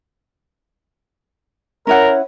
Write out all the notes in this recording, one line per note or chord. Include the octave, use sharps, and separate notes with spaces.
C#4 E4 A#4 C#5 F#5